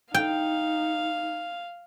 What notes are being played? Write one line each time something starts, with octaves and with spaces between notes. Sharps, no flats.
D#4 F5 G5